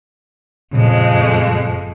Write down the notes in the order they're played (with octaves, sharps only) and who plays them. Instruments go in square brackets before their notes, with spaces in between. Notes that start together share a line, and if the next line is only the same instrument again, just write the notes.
[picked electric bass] F#1 A#2 C#3 [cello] F2 G#3